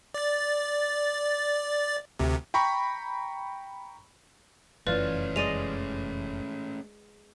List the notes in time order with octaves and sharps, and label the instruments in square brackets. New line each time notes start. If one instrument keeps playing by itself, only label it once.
[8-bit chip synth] D5 A6
D2 C3
[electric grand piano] G5 A#5 B5 C#6
[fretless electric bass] F1 F#2 E3 [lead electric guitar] A3 C#4 [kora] F4 [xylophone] B4 D5
[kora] G#3 D5 D#5 [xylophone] D#7 F7